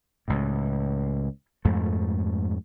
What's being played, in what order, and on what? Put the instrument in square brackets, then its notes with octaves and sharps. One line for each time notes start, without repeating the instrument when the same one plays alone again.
[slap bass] C#2 A2
F2 G#2 A3